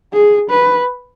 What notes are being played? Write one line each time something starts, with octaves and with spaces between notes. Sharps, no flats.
G#4
B4